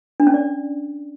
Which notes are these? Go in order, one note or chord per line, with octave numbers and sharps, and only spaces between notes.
D4
C#4
D5